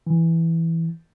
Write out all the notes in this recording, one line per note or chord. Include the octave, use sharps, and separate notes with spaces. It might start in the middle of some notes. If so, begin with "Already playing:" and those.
E3